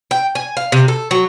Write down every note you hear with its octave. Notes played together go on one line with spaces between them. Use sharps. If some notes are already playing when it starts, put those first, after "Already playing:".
G5
G#5
F5
C3
A4
F#3